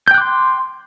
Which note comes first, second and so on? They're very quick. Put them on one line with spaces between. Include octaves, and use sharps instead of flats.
G6 G5 F#6 D6 C6